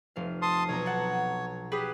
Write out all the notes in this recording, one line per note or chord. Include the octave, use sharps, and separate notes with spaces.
F1 F5
A5 C6 D#6
B1 C#5 A#5
F#5 A5
G4 G#4 B4 D6